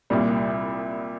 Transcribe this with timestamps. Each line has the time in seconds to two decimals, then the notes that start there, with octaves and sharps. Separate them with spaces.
0.10 C2 A#2 G3